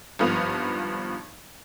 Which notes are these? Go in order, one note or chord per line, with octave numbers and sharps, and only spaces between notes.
G#1 G2 F3 B3 B4 F7